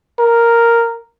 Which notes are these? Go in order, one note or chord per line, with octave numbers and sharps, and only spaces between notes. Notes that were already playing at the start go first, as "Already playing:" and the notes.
A#4